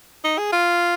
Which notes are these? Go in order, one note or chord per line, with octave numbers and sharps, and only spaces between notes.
D#4
G#4
F4